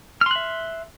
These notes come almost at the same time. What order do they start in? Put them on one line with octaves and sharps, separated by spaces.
F6 C6 F#6 E5